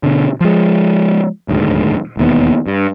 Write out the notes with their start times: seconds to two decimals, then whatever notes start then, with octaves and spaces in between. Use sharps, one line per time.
0.03 B2 D3
0.41 F3 G#3
1.48 D#1 D2 G#2
2.17 E1 D#2 B3
2.67 G2